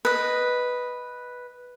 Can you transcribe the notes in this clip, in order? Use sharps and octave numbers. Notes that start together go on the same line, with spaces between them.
B4 D#5